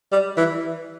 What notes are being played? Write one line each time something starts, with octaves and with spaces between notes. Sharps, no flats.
G3
E3